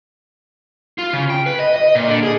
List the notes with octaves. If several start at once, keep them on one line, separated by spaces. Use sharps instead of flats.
F4
C#3
G5
B4
D#5
D#5
A#2
D3
G#4